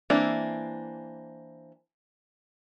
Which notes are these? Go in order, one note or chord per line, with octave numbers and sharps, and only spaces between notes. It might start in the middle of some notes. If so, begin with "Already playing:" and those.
E3 A#3 C4 D4 E4